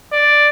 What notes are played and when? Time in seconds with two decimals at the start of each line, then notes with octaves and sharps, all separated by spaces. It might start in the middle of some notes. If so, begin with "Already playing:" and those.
0.12 D5